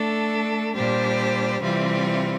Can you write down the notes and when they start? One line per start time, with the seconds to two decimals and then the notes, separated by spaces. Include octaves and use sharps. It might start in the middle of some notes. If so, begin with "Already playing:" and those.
Already playing: A3 D4 A4
0.75 A#2 G3 D4 G4 C5
1.61 C3 E3 G3 C4 F4